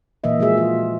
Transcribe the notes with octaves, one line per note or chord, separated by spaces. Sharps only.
A#2 E3 A#3 D#5 E5
F3 G#3 F4 F#4 G#4 E5
F4